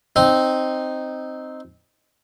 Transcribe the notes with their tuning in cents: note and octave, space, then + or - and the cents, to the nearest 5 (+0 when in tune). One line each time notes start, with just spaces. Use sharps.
C4 +0 D#4 -5